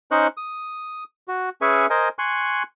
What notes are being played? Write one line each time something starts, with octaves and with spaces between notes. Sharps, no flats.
C#4 D#4 C5 D#5 C#6 F#6
D#6
F#4
C#4 G#4 B4 E5 G#5 C#6
A#4 C5 D#5 G#5
G#5 C6 C#6 F#6